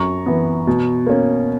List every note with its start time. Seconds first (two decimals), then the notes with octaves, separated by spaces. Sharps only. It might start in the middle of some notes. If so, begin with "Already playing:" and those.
Already playing: F#2 A#5 C#6
0.26 E3 B3
0.67 B2
1.07 A#3 C#4